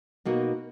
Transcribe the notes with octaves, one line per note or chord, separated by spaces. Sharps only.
B2 A#3 D#4 F#4